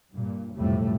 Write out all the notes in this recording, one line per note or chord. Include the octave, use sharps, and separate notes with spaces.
G2 A#2
B1 F2 A2 C3 G3 A3